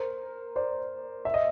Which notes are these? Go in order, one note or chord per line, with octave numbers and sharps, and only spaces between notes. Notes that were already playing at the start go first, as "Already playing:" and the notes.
Already playing: A#4 C5
C5 D5
E5
D#5